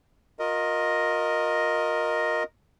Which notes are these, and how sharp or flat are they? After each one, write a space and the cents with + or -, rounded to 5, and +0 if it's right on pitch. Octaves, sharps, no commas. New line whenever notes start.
F4 +35 A#4 +0 D#5 +0